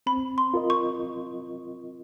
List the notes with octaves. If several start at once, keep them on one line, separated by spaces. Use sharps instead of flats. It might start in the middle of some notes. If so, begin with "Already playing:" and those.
C4 B5
C6
F4 A#4 D#5
C#6